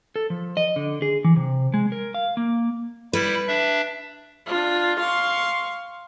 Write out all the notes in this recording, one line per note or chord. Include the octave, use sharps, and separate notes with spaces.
A4
F3
D#5
D3
G#4
E3
C3
G#3
A#4
F5
A#3
G3 E4 B4
D4 E5
D4 F4
F5 C6 C#6